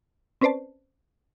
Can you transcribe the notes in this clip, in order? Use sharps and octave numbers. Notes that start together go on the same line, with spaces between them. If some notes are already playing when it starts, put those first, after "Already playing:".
C4 C#4 B4 C5 D5 A5